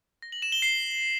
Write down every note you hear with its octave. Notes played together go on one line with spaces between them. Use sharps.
A#6
F#7
E7
G7
C7